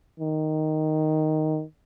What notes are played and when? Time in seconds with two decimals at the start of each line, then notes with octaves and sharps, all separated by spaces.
0.20 D#3